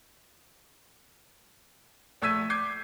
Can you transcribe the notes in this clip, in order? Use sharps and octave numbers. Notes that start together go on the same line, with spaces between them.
A#1 A3 E6 G#6 B6 D#7
D6 G6 G#6 C7